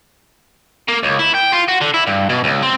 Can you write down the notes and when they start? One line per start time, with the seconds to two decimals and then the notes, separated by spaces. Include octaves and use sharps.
0.88 A#3
1.03 C#2
1.19 E4
1.34 G5
1.52 F4
1.68 F#4
1.81 D3
1.94 E4
2.07 G2
2.29 B2
2.44 C#2
2.62 C4